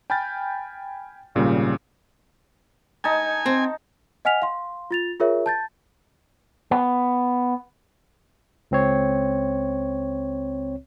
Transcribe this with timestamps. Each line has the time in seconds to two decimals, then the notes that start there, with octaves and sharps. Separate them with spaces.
0.10 G5 G#5 B5 F6 G6 A6
1.35 G#1 A#2 C#3 G3
3.04 D#4 G#5 A5
3.46 C4
4.25 D#5 F#5 G#5 F6 B6 F7
4.42 F5 C6
4.91 F4 A6 F7
5.20 F4 G#4 A#4 C#5 E5
5.46 A5 G6 A6
6.71 B3
8.71 C#2 C4 C#5